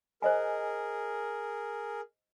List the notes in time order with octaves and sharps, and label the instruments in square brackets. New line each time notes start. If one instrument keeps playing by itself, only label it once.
[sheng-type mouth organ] G#4 A#4 [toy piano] C5 D#5 G#5